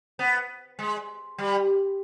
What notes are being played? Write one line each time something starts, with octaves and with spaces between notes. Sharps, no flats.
B3
G#3
G3